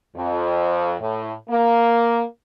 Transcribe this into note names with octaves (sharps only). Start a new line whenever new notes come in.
F2
A2
A#3